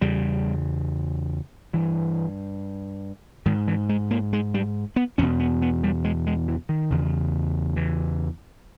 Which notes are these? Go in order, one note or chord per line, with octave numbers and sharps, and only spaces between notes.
E2 C#3 G3
G2 E3
G#2 D#3
E3
G#3
A#3
G#3
G3
B3
E2 B2 C#4
B3
B3
G3
G#3
G#3
E3
D#3
E2 C#3
E3